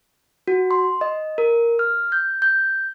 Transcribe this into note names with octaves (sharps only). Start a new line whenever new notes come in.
F#4
C6
D#5
A#4
F6
G6
G6